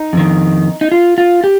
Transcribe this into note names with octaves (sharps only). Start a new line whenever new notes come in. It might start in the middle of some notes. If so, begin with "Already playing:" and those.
Already playing: D#4
F2 D#3
D#4
F4
F4
G4